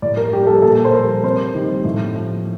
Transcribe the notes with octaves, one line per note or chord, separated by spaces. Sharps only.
A2 D5
A#4
G3 G4
G4
A4
A#2 A4
C5
G3 A#4
C3 C5
D#3 G3
A2
F3